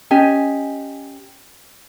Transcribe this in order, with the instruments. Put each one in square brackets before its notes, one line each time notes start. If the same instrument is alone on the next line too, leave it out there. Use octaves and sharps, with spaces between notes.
[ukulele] C#4 G4 D#5 G#5